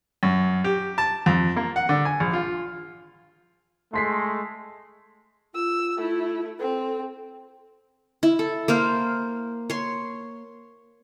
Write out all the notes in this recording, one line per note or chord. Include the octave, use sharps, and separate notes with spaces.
F#2
G4
A5
F2
A#3
F#5
D3
G#5
A#1
F4
G#3 A3 C6 B6 C7
F4 E6
A3 E4
C4 A4
E4
A4
A#3 C5 F5
C#5 C6